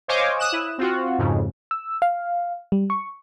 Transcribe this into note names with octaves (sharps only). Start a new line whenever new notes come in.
C5 C#5 D#5 F5 G#5 D6
D#6 F#6 E7
E4
C4 F4 F#4
F2 G#2 C#3
E6
F5
G3
C#6